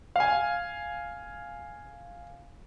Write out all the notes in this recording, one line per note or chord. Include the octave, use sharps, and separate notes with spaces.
F5 G#5